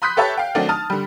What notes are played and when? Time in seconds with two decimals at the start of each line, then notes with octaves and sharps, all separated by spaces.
0.02 B5 C6 D#6 F#6 G6 B6
0.17 G4 A4 B4 C#5 E5 A5
0.37 F5 G5
0.55 D#3 F#3 A3 C4 D4 D#4
0.69 A5 D#6 F6
0.90 D3 G3